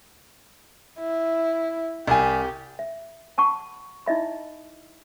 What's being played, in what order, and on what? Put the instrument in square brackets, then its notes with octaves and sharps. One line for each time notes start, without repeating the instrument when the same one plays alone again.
[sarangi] E4
[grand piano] C2 G#5 [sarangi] G4
[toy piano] E5
F#5 A5 B5 C#6
D#4 E4 D#5 E5 B5